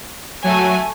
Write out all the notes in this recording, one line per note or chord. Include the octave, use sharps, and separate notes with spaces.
F#3 A3 G#5